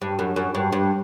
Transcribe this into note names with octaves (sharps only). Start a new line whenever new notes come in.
G2
F#2
F#2
G2
G2